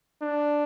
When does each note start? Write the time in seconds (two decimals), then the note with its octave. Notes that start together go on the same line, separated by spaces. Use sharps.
0.23 D4